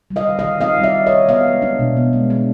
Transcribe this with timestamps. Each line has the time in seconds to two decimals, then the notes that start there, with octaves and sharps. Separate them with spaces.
0.10 G3
0.16 D#5 F5
0.28 D#3
0.39 D#5 F5
0.44 D#3
0.61 C4 D#5 F5
0.79 G3 D5 E5
0.95 D#3
1.06 C#5 D#5
1.12 D#3
1.29 B3 D#5 F5
1.46 G#3
1.62 D4
1.79 B2
1.97 B3
2.13 G#3
2.30 D4